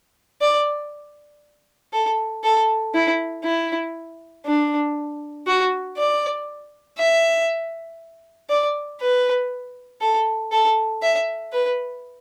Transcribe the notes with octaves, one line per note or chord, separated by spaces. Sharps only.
D5
A4
A4
E4
E4
D4
F#4
D5
E5
D5
B4
A4
A4
E5
B4